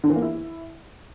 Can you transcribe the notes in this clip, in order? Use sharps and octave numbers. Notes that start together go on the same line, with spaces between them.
D3
E3
A#3
E4